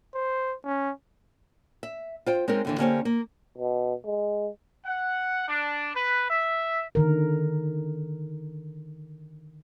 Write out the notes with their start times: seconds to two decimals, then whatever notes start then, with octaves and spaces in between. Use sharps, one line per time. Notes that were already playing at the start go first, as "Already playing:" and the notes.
0.15 C5
0.65 C#4
1.83 E5
2.26 F4 C5 G5
2.48 G#3 C4 C#4 D#4 A#4
2.65 D#2 D3 E3
2.78 D3 A#3 C#4 G4 C5 C#5
3.05 A#3
3.58 B2
4.06 G#3
4.85 F#5
5.48 D4
5.94 B4
6.30 E5
6.95 D3 D#3 A#4